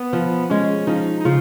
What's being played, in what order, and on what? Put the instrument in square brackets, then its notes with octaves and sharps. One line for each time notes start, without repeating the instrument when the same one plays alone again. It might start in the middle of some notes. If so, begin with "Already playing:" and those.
Already playing: [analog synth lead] B3
[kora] F3
[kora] G#3 [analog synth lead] C#4
[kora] F3 [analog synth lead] D#4
[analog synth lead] D#4
[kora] C#3 [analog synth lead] F4